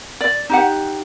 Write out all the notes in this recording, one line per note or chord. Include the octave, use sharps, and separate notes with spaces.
D5
D#4 G4 F#5